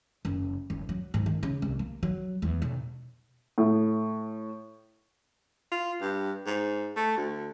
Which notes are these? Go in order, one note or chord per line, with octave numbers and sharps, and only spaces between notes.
F#1
F#1
F#3
G#2
D#3
C#3
C2
A#3
F#3
E2
B1
A2
F4
G2
G#2
A3
D2